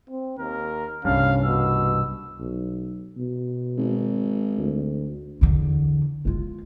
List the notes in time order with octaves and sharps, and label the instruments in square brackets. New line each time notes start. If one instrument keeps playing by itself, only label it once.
[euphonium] C4
[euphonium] D#2 [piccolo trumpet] A#4
[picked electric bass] C2 G2 [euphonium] C#4 [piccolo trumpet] F5
[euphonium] B2 [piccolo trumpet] E6
[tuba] B1
B2
[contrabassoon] G#1
[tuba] D2
[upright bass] E2 D3
G#3 F4